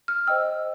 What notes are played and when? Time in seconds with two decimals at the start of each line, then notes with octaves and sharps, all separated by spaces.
0.08 F6
0.27 C5 D#5 G5 E6